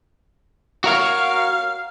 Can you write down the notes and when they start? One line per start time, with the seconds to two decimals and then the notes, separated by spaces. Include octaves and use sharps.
0.84 F#4 A#4 C#5 F5